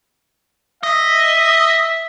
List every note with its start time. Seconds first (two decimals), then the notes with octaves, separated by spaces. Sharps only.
0.83 D#5 E5